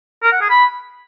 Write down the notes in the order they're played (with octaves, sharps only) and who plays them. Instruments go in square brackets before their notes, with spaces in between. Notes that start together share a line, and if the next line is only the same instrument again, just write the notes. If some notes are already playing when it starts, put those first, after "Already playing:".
[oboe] A#4
F#5
G#4
B5